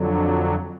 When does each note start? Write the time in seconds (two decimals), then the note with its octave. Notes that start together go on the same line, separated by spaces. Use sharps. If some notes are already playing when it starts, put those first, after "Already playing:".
Already playing: F2 D3 F#3